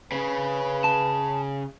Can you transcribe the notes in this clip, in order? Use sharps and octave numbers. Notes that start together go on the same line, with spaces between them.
C#3 C#4 B4
A5